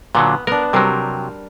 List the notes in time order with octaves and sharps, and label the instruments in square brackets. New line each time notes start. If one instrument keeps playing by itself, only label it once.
[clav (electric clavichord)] A#2 D3 F#3 [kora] B3
[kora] B3 D4 [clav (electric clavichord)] A#4
[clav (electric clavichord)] C3 F#3 [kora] G3 A#4 C5